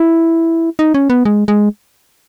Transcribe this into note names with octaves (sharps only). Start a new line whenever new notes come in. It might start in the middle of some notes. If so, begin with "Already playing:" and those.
Already playing: E4
D#4
C#4
B3
G#3
G#3